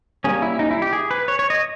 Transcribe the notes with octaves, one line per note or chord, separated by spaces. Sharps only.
G3 A#3 C#4 G#4
E4
D#4
E4
G4
G#4
B4
C#5
C#5
D#5